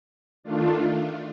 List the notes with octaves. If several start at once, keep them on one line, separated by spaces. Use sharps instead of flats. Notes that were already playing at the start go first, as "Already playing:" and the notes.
D#3 A3 D4 F4